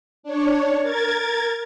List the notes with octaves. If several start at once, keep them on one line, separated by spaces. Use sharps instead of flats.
D4 C#5
A#4 G#6 A6